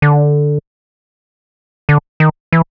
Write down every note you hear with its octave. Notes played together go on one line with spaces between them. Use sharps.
D3
D3
D#3
E3